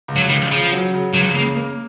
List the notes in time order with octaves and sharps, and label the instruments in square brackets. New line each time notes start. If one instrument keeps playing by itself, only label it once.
[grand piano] C#2
[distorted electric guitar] F#3
[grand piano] C#2 [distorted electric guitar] D#3
[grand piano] C#3 [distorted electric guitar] F3
[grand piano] F#3
C#3
[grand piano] C#2 [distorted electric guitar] F#3
[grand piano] C#3 [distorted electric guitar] A#3
[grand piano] A#3